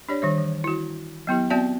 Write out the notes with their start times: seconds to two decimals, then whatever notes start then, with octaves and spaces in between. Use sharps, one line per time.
0.09 D4 G4 C#5 D5
0.22 D#3 G3 C#5
0.38 E3
0.64 E4 F#4
1.27 F#3 B3 E4 G4
1.50 B3 C4 F#4 D5 E5 A5